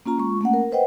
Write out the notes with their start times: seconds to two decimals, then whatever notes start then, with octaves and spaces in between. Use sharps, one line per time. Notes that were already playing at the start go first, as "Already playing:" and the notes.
0.06 A#3 C#4 F4 A#5
0.18 G#3 F4 C#6
0.41 A3 A#3 C#4 F#5
0.53 A#4
0.72 B4 C5 D#5 F#5 G5